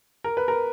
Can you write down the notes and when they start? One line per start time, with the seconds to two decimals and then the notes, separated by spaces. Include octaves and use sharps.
0.24 A#4
0.37 B4
0.48 A#4